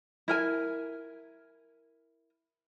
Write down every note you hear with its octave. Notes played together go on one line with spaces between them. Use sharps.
E4 A#4 G#5